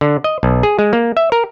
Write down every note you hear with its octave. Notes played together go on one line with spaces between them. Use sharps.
D3
D#5
B1
G#4
G#3
A#3
E5
A#4